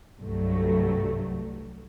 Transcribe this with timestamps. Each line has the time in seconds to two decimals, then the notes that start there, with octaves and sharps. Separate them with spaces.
0.22 C2 G2 F#3 A3